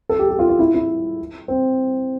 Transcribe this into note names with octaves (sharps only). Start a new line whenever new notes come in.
A4
G4
G4
F4
F4
E4
E4
C4